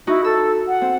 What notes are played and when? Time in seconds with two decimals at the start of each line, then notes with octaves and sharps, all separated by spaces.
0.07 D#4 E4 F#4
0.24 A4 E6
0.68 F#5
0.81 C4